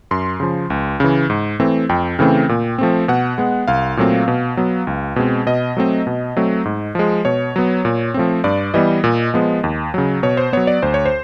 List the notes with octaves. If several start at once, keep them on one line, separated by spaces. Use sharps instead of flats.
F#2 C6
C#3 F3
C#2
C#3 E3
G#2
E3 A3 C4
F2 G5
C#3 E3 A3 C4
A#2
F3 A3 C4
B2 F#5
G#3 B3
C2 F5
A#2 F#3 A3 C4
B2
F#3 B3
C#2
B2 G#3 C4
B2 D#5
F#3 A3 C4
B2
F#3 A3 C4
G#2
F3 G#3
B2 C#5
F#3 B3
A#2
F3 A3 C4
G2 D5
E3 G3 B3 D#5
A#2
F3 G#3 B3
D#2
C#3 F#3
B2 C#5
C5
F#3 B3 C#5
D5
D2 C5
C#5
C5